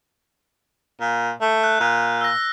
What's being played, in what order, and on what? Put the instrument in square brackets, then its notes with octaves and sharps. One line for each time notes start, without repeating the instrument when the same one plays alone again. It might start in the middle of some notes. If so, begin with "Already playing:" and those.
[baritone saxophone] A#2
A3
[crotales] F#6
[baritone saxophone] A#2
[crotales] E6 A#6